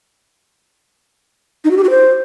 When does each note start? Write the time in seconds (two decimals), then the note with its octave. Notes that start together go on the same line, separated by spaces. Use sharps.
1.64 D#4
1.71 F#4
1.77 G4
1.84 F#4
1.90 C5